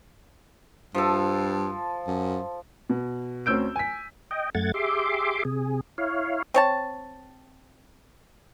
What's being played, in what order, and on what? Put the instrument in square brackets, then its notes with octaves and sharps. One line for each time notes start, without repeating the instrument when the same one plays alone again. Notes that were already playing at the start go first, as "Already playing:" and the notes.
[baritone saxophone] G2 [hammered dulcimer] F3 A4
[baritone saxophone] F#2
[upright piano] B2
D2 C4 C#4 E6 G6 D7
G#5 B6
[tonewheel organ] D#5 G5
F#2 A3 F#5 G#6 A6
G4 G#4 E5 C6 D6
C3 G#4
E4 C#5 F5
[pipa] C4 C#5 A5